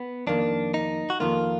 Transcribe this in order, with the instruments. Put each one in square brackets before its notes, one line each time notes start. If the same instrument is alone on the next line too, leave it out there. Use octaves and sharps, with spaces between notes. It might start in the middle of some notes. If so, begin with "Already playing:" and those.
Already playing: [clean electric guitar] B3
[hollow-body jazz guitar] F2 D#3 A#3 [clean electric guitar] D4
[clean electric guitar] D#4
F#4
[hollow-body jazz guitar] F2 D#3 A#3 [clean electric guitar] F4